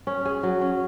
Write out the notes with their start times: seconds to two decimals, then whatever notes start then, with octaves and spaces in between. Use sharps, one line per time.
0.07 C#4
0.25 G#4
0.43 F#3
0.61 C#4